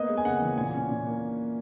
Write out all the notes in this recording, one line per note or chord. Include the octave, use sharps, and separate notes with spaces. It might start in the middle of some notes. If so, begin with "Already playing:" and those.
Already playing: A#3 B3 D#5
G#3
G#5
C#3 F#5
E3
A#2 G#5
C#4
A#2
A#3